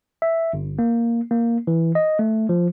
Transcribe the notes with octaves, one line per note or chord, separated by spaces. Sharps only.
E5
G1
A#3
A#3
E3
D#5
A3
F3